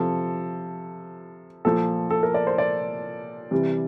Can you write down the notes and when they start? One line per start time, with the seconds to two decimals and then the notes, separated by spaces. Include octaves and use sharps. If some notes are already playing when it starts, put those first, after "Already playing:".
Already playing: C3 F3 A4
1.65 A#2 F3 A4
2.11 A4
2.23 A#4
2.34 D5
2.47 C5
2.58 D5
3.51 C3 E3 G3